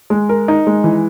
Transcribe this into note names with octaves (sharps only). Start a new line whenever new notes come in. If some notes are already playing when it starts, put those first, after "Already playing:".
G#3
A#4
D#4
G#3
E3